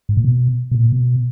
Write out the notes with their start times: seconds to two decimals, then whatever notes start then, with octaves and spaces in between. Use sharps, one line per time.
0.09 G#2
0.17 A#2
0.25 B2
0.71 B2
0.75 A#2
0.92 B2